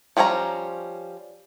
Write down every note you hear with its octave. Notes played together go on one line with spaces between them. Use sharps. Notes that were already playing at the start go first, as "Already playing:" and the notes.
F3 G3 C#4 E4 A#5